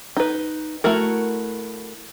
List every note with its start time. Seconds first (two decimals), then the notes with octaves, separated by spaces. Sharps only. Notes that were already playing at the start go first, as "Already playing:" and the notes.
0.17 D#4 B4
0.84 A3 E4 F#4 A#4